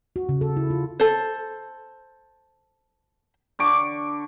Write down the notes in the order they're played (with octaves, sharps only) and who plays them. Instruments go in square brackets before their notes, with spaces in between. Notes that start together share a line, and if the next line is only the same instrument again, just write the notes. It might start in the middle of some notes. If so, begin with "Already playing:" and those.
[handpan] F#4
C#3
A4
E4
F4
[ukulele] A4 C5
[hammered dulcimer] D3 C#6 D6